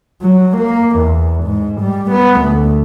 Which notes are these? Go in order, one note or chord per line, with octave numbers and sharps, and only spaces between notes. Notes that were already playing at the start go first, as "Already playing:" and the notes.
F#3
A#3
E2
G#2
G3
B3
D2